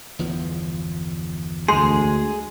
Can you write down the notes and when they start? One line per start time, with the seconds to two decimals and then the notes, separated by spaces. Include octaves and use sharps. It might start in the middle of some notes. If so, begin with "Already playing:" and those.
0.19 G1 E2 F3
1.68 D2 G#3 G#4 C6